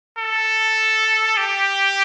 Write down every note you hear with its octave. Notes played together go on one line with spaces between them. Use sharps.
A4
G4